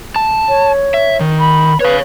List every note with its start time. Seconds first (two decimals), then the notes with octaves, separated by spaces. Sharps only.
0.16 A5
0.49 C#5
0.94 E5
1.20 D#3
1.39 B5
1.80 B4 C#5 F5